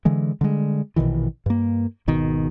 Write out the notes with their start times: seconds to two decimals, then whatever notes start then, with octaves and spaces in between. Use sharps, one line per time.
0.05 D3 E3 G#3
0.41 D3 G3 G#3
0.96 A#1 B2 D#3 E3
1.46 G2 A#3
2.08 G#1 B2 D#3